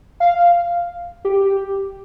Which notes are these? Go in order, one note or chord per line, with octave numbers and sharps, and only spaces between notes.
F5
G4